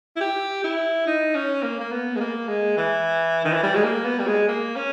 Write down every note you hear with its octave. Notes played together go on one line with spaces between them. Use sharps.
E4
G4
E4
D#4
C#4
A#3
A#3
B3
G#3
A#3
G#3
E3
D#3
E3
G3
G#3
A#3
B3
G3
G#3
A#3
C#4